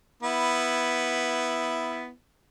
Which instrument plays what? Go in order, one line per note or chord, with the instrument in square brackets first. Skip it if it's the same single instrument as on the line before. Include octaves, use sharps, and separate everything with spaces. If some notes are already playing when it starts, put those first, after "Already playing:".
[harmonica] B3 E4